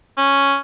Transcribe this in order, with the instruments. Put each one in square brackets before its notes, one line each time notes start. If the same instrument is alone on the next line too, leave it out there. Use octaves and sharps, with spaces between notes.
[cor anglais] C#4